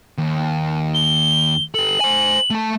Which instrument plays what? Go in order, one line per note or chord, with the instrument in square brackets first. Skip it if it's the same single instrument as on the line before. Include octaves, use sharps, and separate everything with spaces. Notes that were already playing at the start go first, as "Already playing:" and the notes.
[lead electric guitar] D#2
[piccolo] G7
[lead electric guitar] G4 A4 [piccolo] F#7
[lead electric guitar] C5 G#5
A3 A5